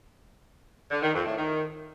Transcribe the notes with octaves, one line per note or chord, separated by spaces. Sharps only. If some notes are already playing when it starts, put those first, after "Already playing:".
D3
D#3
F2
A2
D#3